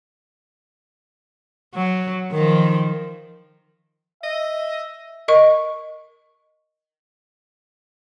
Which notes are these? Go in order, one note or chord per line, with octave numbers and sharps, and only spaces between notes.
F#3
D#3 F3
D#5 E5
A#4 D#5 C#6